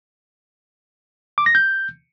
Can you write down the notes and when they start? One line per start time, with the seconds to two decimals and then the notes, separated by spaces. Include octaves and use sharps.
1.38 D6
1.46 A#6
1.55 G6